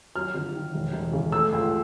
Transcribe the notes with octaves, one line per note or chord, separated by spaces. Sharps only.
F#3 F6
G1
D#3
E1
E1
C#3
A3 E6
C#2